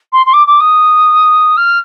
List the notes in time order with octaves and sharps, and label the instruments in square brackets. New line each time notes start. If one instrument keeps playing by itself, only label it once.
[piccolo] C6
C6
D6
D6
D#6
F6